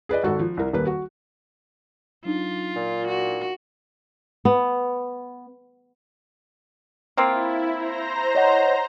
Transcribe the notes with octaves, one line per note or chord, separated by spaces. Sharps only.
G#4 B4 D5 D#5
G#1 F#4 A4
F3
C2 A#4
D#1 A#3 B4
F#4
F#3 D4 D#4 F4
A#2
F#4
B3
A#3 C4 E4 F4
C5 A#5 A#6
C#5 D#5 F#5